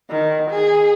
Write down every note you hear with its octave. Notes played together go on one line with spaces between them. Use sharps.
D#3
G#4